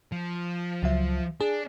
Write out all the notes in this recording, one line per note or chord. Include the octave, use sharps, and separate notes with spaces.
F3
C#2 F#3 E5
D4 G#4